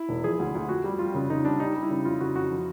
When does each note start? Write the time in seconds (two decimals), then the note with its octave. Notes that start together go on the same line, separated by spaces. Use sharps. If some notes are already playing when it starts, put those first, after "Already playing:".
Already playing: E4
0.09 E1
0.24 F3 G#4
0.39 D2
0.55 D2
0.69 F2 F#4
0.84 G3 G4
0.99 F2 F4
1.14 C#3
1.30 C#3 D#4
1.44 G3 D4
1.60 G3 D#4
1.75 G3
1.83 E4
1.90 C#3
2.05 F2 F4
2.20 C#3 F#4
2.36 F2 F#4
2.51 F3